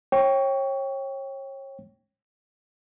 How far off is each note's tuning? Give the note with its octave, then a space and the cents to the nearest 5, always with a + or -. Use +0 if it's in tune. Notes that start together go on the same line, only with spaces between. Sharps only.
C#5 -30 G5 +0 C#6 +20